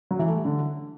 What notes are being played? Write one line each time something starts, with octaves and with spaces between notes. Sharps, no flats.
F#3
E3
A3
G3
D3